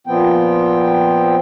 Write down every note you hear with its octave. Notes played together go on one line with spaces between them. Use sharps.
A#2 F3 B3 C4 G5